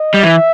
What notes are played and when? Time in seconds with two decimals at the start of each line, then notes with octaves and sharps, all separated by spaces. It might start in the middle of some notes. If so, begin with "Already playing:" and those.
Already playing: D#5
0.14 G3
0.23 E3 E5